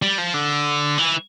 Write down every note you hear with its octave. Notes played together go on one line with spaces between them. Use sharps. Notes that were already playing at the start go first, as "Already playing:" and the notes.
G3
F3
D3
E3